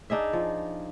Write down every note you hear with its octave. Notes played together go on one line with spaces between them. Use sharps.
D4 D#4 G#4 E5
F3